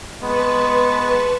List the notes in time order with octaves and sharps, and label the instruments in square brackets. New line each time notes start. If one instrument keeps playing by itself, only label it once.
[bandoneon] G#3 B3 [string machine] B4 A5 C#6